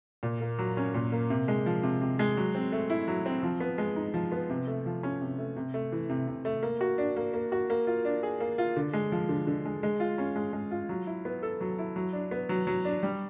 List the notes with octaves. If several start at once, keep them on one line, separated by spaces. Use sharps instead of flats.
A#2
A#3
F#3
C#4
A#2
A#3
C3
G#3
F3
C3
C3
G#3
F#3
C4
A3
E4
F#3
C4
F3
B3
G#3
D#4
F3
B3
C3
A3
F3
C#4
C3
A3
C3
A3
E3
C3
C3
A3
A#3
F#4
D4
A#3
A#3
F#4
A#3
F4
D4
G#4
A#3
F4
D3
G#3
F3
D3
D3
G#3
G#3
F4
C#4
G#3
G#3
F4
F#3
E4
B3
A4
F#3
E4
F#3
D4
B3
F#3
F#3
D4
G3